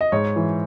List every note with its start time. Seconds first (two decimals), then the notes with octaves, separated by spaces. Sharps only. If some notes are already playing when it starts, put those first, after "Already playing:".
0.01 D#5
0.12 G#2 C#5
0.36 E3